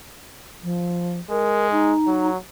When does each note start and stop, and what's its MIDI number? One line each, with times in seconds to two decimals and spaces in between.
0.63 1.19 53
1.30 1.93 56
1.30 1.70 70
1.71 2.29 63
2.07 2.37 54